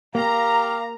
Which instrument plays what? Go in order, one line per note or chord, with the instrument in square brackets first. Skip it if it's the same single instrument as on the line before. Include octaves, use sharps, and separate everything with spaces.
[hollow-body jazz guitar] A#3 [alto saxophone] G4 [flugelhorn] F5 [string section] A#5